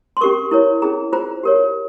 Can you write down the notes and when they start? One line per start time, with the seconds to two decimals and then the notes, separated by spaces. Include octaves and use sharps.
0.17 C6
0.21 C#4 G4 A#4 C#6
0.51 E4 A#4 C#5
0.82 C#4 E4 G#4 A#5
1.13 F4 C5 A#5
1.43 G4 A#4 C#5